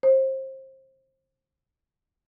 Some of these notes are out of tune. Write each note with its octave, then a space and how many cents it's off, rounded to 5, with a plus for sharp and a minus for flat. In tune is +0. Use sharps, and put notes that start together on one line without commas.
C5 +25